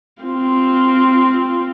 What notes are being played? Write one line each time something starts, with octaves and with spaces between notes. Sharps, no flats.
C4 F4